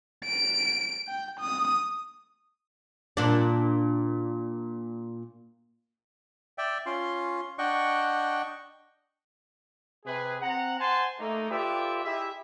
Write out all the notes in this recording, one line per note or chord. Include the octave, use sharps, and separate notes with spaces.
D7
G5
D#6
A#2 D4
D5 E5 G5
C#4 F4 C6
D4 D#5 F#5 G5 C#6
C3 G#4 B4
C4 F#5 A#5
C5 F#5 G#5 A5 C6
A3 A#3 D#4
F4 G4 A4 B4 D5 E5
E4 G4 G#4 D#5 E5